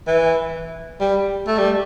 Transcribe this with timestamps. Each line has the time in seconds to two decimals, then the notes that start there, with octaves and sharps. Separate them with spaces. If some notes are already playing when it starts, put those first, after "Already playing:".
0.07 E3
1.00 G3
1.47 A3
1.58 G3